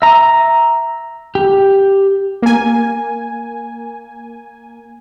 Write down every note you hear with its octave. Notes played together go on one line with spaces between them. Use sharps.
E5 A#5
G4
A#3 G#5